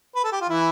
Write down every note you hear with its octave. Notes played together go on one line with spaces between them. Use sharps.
B4
A4
G4
F4
E3 E4